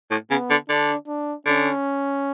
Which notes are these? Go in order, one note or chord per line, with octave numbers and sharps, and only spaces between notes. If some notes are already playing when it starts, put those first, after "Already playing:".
A2
C#3 B3
D3
D3 D4
D4
D3 C#4